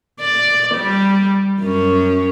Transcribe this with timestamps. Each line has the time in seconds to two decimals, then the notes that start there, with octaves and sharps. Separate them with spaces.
0.21 D5
0.75 G3
1.62 F#2 C#4